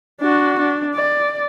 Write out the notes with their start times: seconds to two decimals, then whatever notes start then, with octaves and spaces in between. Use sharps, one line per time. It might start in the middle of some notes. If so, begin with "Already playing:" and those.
0.21 D4 F#4
0.59 D4
0.95 D5